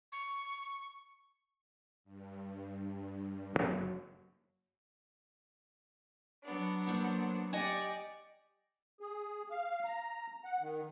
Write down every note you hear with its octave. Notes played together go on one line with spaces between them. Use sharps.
C#6
G2
F#1 A2 F#3
F#3 B3 D4
A#3 C5
G4 D5 D#5 F#5 G#5
G#4
F5
A#5
F#5
D#3